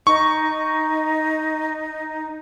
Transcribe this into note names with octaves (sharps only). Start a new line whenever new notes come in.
D#4 C#6